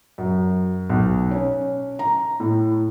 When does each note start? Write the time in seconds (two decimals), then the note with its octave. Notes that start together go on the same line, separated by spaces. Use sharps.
0.18 F#2
0.90 B1
1.31 C#4
1.99 A#5
2.40 A2